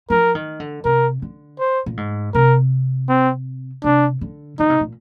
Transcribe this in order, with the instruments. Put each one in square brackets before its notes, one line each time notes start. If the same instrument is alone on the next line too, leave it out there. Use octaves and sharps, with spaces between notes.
[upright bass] F3 [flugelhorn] A#4
[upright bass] D#3
D3
[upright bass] C3 [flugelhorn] A#4
[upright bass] D3
[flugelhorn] C5
[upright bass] A#2
G#2
[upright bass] C3 [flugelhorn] A#4
[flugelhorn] C4
[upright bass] C3 [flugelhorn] D4
[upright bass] D3
[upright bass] D3 [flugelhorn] D#4
[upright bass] C3
A#2